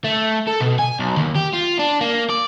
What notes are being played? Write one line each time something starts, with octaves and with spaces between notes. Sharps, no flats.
A3
A4
B2
G#5
B1
D#2
G4
F4
D4
A#3
D5